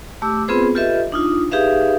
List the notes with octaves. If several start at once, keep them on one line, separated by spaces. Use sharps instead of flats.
A3 G4 D6 E6
B3 C4 F4 G#4 B4 C5
F4 G4 A4 B4 D#5 E5
D4 D#4 F4
D#4 G4 G#4 B4 E5 F5